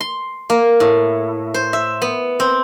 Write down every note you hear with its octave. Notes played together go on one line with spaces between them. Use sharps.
C6
A#3
A2
C5
E5
B3
C4